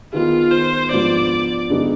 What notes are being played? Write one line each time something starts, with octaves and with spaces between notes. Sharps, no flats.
D#3 B3 D#4 F4 G#4
C5
G#2 F3 B3 D4 D5
G2 D3 G#3 B3 D#4